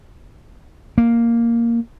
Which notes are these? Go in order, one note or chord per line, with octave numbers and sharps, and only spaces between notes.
A#3